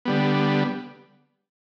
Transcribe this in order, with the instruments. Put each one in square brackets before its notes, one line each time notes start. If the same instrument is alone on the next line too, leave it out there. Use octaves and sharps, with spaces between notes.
[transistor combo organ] D3 G3 B3